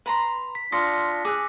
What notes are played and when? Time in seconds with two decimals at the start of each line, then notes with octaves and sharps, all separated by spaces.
0.06 B4 A#5 C6
0.55 B6
0.72 D4 F4 C6 D#6 A#6 C#7
1.25 G#4 D6 E6 F#6